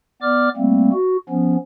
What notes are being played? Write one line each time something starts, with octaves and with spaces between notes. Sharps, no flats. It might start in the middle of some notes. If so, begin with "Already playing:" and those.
B3 D5 D6 F6
G3 A3 A#3 C4
F#4
F3 B3 C#4